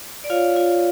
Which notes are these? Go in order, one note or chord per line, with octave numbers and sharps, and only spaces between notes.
D5
F4 C#5 F5
F4